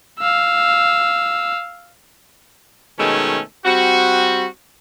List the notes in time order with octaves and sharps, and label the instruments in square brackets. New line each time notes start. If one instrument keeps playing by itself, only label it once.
[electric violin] F5 E6
[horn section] B2 D#3 G#3 A3 C#4
G3 C4 F#4